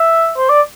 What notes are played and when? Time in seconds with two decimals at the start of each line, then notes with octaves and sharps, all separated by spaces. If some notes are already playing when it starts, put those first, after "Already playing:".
Already playing: E5
0.37 C5
0.49 D5